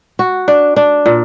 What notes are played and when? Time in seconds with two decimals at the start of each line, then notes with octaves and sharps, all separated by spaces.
0.19 F#4
0.48 D4
0.76 D4
1.06 A#2